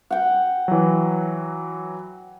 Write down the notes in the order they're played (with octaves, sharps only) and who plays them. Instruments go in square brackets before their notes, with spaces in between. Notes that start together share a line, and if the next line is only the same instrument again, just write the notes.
[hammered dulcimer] F#5 G5
[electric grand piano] E3 F#3